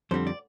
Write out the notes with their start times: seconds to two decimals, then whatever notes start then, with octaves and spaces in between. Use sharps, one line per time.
0.11 F2 D3 G3 C4 C5
0.27 D5